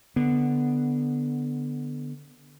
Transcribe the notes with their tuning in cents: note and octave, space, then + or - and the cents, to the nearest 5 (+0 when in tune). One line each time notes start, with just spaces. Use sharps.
D3 +0 B3 +0